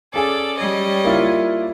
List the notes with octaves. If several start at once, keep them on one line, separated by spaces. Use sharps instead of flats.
C#4 G#4 A4 D5
G3 C#5 D#5
A#3 E4 F4